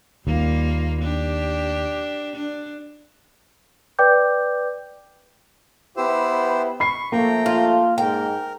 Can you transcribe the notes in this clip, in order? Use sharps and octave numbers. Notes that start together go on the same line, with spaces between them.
D#2 G3 A#3 F4
D4 G4
D4
B4 D5 G5 D6 G6
B3 E4 G4 B4 C5 E6
B5 C#6 C7
F3 A3 A#3 G5 A#5
F4
G#2 A#4 G5